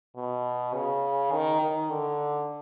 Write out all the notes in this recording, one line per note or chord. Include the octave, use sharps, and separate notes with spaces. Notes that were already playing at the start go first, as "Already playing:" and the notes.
B2
C#3
D#3
D#3
D3